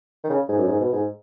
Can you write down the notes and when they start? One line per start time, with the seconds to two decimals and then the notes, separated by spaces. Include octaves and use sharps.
0.24 D#3
0.29 C#3
0.49 G#2
0.58 F#2
0.68 G#2
0.80 B2
0.93 G#2